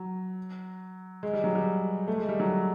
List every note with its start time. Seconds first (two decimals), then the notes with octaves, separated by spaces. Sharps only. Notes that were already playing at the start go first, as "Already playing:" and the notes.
Already playing: F#3
1.23 G#3
1.33 G3
1.44 F#3
1.55 G3
2.08 A3
2.18 G#3
2.28 G3
2.40 F#3